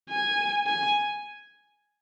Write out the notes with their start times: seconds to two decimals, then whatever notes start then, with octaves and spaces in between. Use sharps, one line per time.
0.10 G#5
0.67 G#5